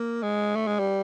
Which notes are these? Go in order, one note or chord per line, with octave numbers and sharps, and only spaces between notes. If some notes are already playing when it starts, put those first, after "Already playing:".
Already playing: A#3
G#3
A3
G#3
G3